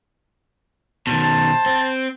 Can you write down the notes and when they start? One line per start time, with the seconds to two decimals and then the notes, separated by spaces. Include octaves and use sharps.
1.07 B2 D#3 C5 A5
1.66 C4